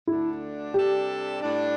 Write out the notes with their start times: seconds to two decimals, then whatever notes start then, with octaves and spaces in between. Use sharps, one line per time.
0.07 D2 D3 A3 D4 E4
0.74 C3 G3 D4 G4 A4
1.42 A2 G3 D4